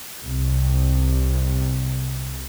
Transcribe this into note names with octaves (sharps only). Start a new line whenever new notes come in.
C2 C3